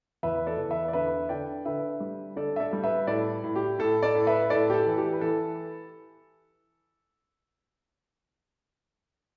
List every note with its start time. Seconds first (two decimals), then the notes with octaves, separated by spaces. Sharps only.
0.23 E2 B4 E5
0.46 A4 D5
0.58 E2
0.70 B4 E5
0.88 D5
0.93 D3 B4 E5
1.29 D3 D5 G5
1.65 D3 B4 E5
2.00 G3
2.36 D3 A4 D5
2.56 E5
2.60 A4 D5
2.73 G3
2.84 B4 E5
3.07 A2 A4 D5
3.44 A2
3.56 G4
3.79 A2 A4
4.03 A4 D5
4.15 A2
4.27 B4 E5
4.50 A2 A4 D5
4.70 G4
4.74 A4
4.87 E3
4.98 G4
5.13 B4
5.21 E3 A4